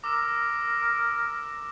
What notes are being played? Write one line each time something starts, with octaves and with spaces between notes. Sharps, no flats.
A#4 D6 E6 E7